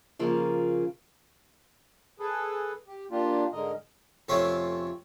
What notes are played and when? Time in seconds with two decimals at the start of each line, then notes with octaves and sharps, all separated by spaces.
0.19 C#3 F3 A#3
2.20 G#4 A4 B4
2.87 G4
3.11 A#3 D4 F4 G4
3.53 G#2 D3 A#4 D#5
4.29 F2 C3 A3 C4 C#4